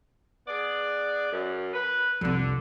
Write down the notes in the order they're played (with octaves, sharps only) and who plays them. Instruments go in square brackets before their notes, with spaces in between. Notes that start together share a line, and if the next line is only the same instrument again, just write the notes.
[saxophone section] B3 G#4 D5
F#2
B4
[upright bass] C2 F2 [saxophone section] D3